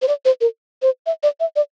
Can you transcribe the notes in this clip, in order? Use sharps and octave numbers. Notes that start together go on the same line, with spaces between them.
C5
D5
C5
A#4
C5
E5
D5
E5
D5